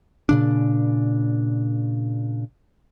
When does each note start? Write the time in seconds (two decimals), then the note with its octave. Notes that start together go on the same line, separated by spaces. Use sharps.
0.29 A#2 C#3 D4